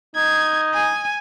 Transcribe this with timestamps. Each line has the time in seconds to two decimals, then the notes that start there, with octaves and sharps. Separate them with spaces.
0.16 D#4 G#6
0.74 G#5